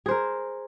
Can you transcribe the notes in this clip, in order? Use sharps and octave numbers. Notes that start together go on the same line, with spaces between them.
G#4 A#4 C5